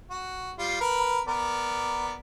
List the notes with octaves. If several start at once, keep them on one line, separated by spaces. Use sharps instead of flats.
F#4
G3 F4
A#4 B4 B5
B3 A#4 D5